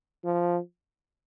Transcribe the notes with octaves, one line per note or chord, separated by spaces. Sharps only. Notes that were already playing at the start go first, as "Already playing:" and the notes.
F3